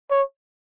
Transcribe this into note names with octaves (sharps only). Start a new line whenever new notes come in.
C#5